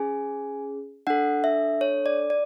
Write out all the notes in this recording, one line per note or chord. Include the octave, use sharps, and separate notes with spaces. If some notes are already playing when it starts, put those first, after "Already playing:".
Already playing: C#4 G#4 G#5
D4 A4 F#5
E5
C#5
D5
D5